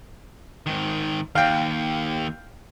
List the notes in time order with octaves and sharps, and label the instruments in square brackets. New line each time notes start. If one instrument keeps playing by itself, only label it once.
[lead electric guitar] G#2 D#3
[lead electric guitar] D#2 [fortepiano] F5 G5